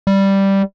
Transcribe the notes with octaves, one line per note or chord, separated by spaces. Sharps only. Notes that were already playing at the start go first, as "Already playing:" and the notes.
G3